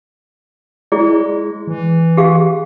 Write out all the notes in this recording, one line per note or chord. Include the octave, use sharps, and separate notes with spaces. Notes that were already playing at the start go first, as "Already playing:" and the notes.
G#3 E4 G#4 D5
E3
G4 G#4 F5